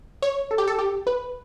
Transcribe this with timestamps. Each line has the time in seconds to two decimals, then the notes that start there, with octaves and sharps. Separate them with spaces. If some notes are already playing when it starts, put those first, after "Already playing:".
0.22 C#5
0.51 A4
0.58 G4
0.67 A4
0.78 G4
1.07 B4